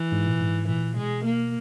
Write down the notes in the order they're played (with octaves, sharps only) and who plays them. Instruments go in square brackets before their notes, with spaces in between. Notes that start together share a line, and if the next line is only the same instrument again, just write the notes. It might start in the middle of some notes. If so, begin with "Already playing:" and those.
Already playing: [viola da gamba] E3
[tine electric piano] G#2
A#2
G#2
[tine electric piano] A#2 [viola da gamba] E3
[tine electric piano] B2 [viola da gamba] G#3
[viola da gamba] A#3